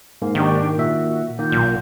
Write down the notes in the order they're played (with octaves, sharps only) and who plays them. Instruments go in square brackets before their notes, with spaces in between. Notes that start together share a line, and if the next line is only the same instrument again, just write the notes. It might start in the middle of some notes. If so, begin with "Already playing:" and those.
[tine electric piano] G#2 A#3 [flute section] F5 F#5
[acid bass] D#3 [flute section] D4 G4 C#6
[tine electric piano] A#2 E5 [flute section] F#4
[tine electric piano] D#3 A#3 [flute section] F4 F#5 G6
[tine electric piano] B1 [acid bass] A#2